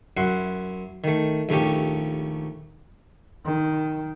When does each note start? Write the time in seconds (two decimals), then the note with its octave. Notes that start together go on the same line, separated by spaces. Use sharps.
0.17 F#2 E4 F#5 C6
1.04 D#3 A3
1.49 A#1 D#2 A3 C#4 G4
3.45 D#3